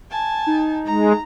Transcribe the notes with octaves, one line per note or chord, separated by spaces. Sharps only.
G#5 A5
D#4
G#3 A#5